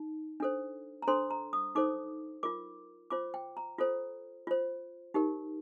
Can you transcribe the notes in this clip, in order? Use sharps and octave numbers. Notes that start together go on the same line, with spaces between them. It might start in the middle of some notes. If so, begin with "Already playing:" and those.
Already playing: D#4
D4 A4 C5
A#5
D4 A4 C5 C6
A#5
D#6
D#4 A4 C5 D6
F4 A#4 D6
F4 C5 D6
G5
A#5
F4 A4 C5
F4 C5
D#4 G4 A#4